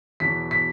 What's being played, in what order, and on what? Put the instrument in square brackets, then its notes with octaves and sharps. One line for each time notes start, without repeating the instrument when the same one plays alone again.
[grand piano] E2 B2 F#3 B6
B6